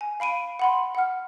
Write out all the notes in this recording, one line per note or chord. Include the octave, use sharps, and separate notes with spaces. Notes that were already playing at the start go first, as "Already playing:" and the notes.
G#5
F5 B5 D7 D#7
F#5 B5 C6
F#5 F6